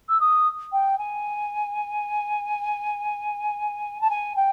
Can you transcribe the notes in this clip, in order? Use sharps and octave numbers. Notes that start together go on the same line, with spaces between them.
E6
D#6
G5
G#5
A5
G#5
G5